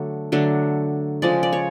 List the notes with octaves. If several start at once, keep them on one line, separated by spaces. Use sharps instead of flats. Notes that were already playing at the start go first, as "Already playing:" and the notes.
Already playing: D3 F#3 A3 D4
D3 F#3 A3 D4
C#3 F3 G#3 D5
D5
C#5